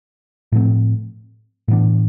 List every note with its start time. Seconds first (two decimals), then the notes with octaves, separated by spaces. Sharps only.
0.52 A2 F3 A3 C4
1.68 A2 E3 B3 D4